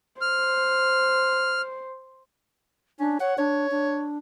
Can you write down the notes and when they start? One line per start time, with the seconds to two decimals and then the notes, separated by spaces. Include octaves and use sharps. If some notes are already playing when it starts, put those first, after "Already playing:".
0.21 C5 F6
2.99 C#4 D4
3.20 C#5 F#5
3.38 D4 C#5
3.71 D4